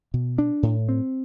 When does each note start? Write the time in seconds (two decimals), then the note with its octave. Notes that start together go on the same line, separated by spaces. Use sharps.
0.14 B2
0.38 D4
0.63 A2
0.89 C4